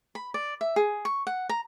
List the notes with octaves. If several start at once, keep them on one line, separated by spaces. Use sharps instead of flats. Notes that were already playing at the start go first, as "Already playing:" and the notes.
B5
D5
E5
G#4
C#6
F#5
A#5